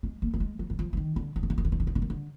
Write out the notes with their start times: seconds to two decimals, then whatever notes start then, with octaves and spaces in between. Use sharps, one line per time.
0.03 G#3
0.22 A#3
0.34 A#3
0.40 G#3
0.59 F#3
0.70 F#3
0.79 F3
0.93 F3
0.97 D#3
1.16 D3
1.36 D3
1.43 D#3
1.50 D3
1.58 D#3
1.65 D3
1.72 D#3
1.80 D3
1.87 D#3
1.95 D3
2.02 D#3
2.10 D3